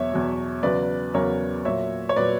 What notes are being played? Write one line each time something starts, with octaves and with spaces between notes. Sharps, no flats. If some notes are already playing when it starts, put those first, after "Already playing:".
Already playing: E2 B2 F#3 C#5 E5
E2 B2 F#3
E2 C#3 F#3 B4 D5
E2 C#3 F#3 A#4 C#5
A#2 F#3 C#5 E5
C#5
A#2 F#3 B4 D5